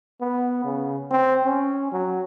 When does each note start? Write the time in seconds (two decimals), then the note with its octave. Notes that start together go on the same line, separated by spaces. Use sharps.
0.21 B3
0.64 C#3
1.11 C4
1.45 C#4
1.92 F#3